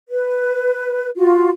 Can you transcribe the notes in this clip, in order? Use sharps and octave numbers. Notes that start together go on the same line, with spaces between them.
B4
F4 F#4